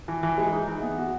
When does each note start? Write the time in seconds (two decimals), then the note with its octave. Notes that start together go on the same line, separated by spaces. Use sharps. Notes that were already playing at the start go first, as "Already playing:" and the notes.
0.08 E3
0.23 E3
0.38 G#3
0.53 D#4
0.67 E3
0.82 B3
0.98 F#4